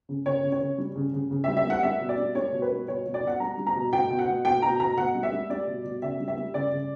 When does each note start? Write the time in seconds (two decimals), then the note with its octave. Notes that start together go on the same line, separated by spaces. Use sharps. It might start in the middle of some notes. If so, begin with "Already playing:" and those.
0.09 C#3
0.26 C#3 C#5
0.43 C#3
0.52 C#5
0.61 C#3
0.78 G3
0.96 C#3
1.13 C#3
1.31 C#3
1.44 E5
1.48 G3
1.57 E5
1.66 G3 F#5
1.83 G3 E5
2.01 B2
2.09 D5
2.18 G3
2.35 G3 C#5
2.52 B2
2.62 B4
2.71 G3
2.88 B2 C#5
3.06 B2
3.14 D5
3.23 B2 F#5
3.40 G3 A#5
3.58 G3
3.67 A#5
3.75 B2
3.93 B2 G5
4.10 B2
4.19 F#5
4.28 B2
4.45 B2 G5
4.62 B2 A#5
4.80 B2 A#5
4.97 B2 F#5
5.15 G3
5.23 E5
5.32 G3
5.50 G3 D5
5.67 B2
5.84 B2
6.02 C#3 E5
6.20 G3
6.28 E5
6.37 G3
6.54 C#3 D5
6.72 C#3